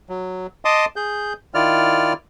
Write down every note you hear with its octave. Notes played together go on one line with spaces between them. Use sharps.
F#3
D#5 A5 C6 D6 D#6
G#4 G6
D#3 E4 F4 D5 F6